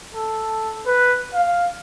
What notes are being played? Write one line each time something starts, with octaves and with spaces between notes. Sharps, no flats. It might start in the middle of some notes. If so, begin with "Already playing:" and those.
A4
B4
F5